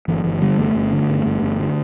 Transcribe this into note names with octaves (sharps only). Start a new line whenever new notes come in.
G1 E3
G1 E3
D3 G3
G1 A3
G1
D3
G1
G1
G1
D3